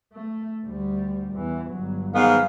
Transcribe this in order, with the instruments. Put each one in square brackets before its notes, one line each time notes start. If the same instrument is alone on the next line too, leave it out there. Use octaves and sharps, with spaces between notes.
[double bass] A3
D2 G3
E2 E3
G1 F#3
[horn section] G#2 D#3 B3 [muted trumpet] F5